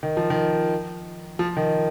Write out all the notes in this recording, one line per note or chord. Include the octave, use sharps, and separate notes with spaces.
D#3
F3
D#3
F3
D#3